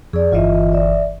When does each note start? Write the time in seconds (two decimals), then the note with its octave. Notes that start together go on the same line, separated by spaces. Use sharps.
0.13 F2 G#4 D5
0.32 G1 E3 F4 D#5 E5
0.73 D5 E5